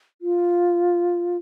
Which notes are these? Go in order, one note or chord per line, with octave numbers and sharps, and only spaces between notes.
F4